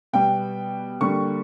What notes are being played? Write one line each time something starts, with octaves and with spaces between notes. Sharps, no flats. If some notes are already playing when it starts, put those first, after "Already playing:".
B2 G3 B3 G5
D3 G3 A#3 C#6